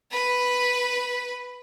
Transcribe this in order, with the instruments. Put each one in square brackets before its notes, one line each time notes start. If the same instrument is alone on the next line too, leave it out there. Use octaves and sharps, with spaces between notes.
[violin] B4 B5